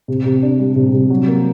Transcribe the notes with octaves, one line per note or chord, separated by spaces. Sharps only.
C3
C3
D4
G3
C3
C3
F#3
A#3